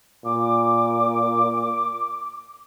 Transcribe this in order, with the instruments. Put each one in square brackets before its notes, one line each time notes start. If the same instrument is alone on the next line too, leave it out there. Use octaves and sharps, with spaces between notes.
[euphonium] A#2 [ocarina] D6